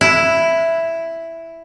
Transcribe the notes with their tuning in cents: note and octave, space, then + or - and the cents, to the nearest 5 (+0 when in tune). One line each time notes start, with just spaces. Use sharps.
E4 +5